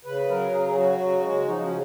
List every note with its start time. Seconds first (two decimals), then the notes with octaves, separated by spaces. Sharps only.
0.05 C#3 B4
0.28 F#3 A#4
0.51 C#3 G#4
0.59 A#4
0.66 G#4
0.75 F#3 F#4
0.99 C#3
1.22 G#3
1.46 F3 D#4
1.61 C#4
1.69 C#3